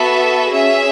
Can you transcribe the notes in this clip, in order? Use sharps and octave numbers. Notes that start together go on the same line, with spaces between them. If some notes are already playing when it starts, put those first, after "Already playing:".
Already playing: B3 F#4 A4 E5
C#4 G#4 E5